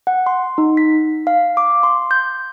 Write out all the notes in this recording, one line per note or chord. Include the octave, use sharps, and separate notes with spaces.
F#5
C6
D#4
B6
F5
D6
C6
G6